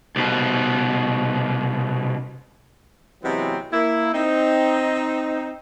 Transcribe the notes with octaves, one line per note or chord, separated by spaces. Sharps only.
C2 B2
C3 E3 F#3 G#3 B3 C4
A#3 E4
C4 D#4